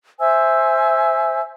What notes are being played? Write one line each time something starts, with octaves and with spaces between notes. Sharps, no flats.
C5 E5 G#5 E6